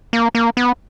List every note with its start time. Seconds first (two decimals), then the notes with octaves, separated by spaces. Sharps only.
0.13 A#3
0.35 A#3
0.57 B3